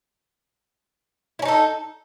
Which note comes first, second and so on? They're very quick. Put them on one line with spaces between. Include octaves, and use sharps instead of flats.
E4 C#4 D#4 A4